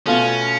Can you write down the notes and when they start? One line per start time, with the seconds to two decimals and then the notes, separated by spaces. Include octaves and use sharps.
0.06 B2 A3 C#4 F4